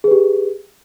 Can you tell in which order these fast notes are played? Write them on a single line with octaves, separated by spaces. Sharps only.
G#4 B4 G4